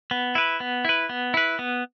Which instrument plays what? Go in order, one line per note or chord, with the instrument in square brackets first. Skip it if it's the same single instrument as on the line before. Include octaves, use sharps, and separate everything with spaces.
[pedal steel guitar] B3
E4 B4
B3
E4 B4
B3
E4 B4
B3